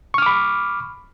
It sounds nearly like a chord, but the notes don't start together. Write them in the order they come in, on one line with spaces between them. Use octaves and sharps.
C#6 F6 D6 B5